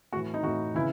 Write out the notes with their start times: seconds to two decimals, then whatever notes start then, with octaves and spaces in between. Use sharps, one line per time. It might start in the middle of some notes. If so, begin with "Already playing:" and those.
0.12 A2 E3 F#4
0.34 D#4
0.43 A2 E3 F#4
0.75 C#3 E3 E4